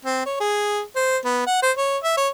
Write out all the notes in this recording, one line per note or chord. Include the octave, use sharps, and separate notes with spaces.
C4
C#5
G#4
C5
B3
F#5
C5
C#5
E5
C#5